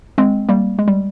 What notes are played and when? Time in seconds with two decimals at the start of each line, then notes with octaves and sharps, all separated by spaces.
0.18 G#3 C4
0.49 G3 A#3
0.79 G#3
0.88 G3